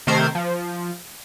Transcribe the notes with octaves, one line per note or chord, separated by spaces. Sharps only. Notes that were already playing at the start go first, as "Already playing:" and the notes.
C3 D#3 A3 A#4 C5 G#6
F3